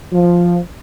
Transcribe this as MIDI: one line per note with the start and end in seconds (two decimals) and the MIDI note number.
0.12 0.57 53